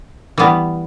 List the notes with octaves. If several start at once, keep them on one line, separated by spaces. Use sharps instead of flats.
E3 G3 B3